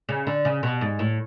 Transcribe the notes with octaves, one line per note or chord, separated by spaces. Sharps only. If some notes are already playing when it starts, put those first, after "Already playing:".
C#3
D3
C#3
B2
G#2
A2